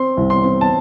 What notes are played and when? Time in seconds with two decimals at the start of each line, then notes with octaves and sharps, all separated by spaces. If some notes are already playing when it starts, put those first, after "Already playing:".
Already playing: C4 C6
0.17 C2
0.30 C6
0.44 C4
0.61 A5